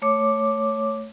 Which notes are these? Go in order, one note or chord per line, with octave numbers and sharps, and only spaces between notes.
A3 C#5 D6